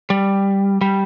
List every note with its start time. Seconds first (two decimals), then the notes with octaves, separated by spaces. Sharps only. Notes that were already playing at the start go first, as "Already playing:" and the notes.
0.10 G3
0.81 G3